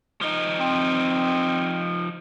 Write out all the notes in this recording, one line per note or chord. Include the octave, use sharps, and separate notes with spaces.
F3 D#4
C4